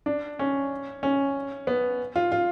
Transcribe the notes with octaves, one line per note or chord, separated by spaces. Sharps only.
D4
C#4
C#4
B3
F4
F4